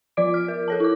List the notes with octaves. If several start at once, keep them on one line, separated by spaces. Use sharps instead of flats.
F3 F4 D5 D6 D7
F6
A#4
A4 C#5 A5
E4 D6